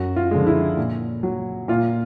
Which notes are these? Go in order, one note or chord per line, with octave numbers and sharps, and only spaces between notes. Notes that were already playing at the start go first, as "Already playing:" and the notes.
Already playing: F#2 F#4
F4
D3 F3 G#3
E4
A#2
F#3
A#2 F4